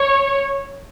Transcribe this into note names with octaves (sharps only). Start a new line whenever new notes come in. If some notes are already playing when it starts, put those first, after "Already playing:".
Already playing: C#5